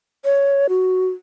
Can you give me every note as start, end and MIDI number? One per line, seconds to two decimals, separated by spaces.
0.25 0.67 73
0.69 1.09 66